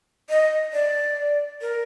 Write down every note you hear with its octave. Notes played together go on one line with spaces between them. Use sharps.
D#5
D5
A#4